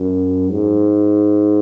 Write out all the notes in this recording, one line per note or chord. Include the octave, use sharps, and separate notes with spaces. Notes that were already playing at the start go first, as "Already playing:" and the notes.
Already playing: F#2
G#2